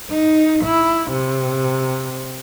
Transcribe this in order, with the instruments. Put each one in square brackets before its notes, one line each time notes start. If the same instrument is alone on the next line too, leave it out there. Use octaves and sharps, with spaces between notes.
[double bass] D#4
E4
C3